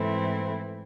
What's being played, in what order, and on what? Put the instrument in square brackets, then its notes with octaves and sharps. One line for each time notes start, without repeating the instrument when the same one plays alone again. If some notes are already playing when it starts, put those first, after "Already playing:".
Already playing: [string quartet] G#2 E3 A3 C4 E4